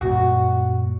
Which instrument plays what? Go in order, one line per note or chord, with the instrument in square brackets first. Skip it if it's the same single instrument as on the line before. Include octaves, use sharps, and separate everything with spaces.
[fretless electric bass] F#2 A#2 G3 [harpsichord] F#4